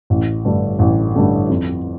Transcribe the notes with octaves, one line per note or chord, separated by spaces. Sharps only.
A1
G2 D3 A3
A1
G2 D3 A3
F2